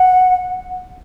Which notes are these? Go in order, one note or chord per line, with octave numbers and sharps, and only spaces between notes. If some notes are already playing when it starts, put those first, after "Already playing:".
Already playing: F#5